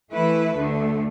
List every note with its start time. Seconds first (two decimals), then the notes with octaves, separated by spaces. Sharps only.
0.12 E3 A3 E4 B4
0.56 D2 D3 A3